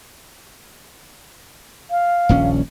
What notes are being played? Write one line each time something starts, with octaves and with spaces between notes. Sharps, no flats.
F5
D#1 A#1 C#4